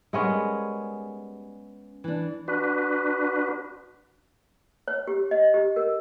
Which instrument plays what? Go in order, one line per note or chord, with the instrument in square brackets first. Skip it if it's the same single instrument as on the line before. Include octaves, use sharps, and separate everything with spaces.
[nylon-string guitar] G3 G#4 A#4 [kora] G#3 B3 C#4
[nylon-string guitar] E3 D4
[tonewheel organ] D4 F#4 B4
[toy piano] C#5
G4
D#5
G4
A#4